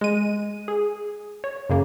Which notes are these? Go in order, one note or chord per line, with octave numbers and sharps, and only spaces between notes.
G#3 D#7
G#4
C#5
F#2 C#3 A#3